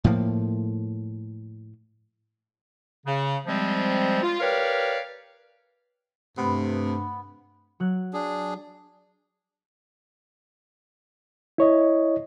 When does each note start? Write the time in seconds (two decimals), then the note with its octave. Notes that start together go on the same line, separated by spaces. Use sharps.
0.04 A2 F3 A#3
3.05 C#3
3.46 C3 F3 G3 G#3 C4
4.22 F4
4.40 G4 A#4 B4 C#5 D5 F5
6.38 G2 C3 A3 B3
7.80 F#3 F#6
8.13 D4 G#4
11.58 E4 C#5 D#5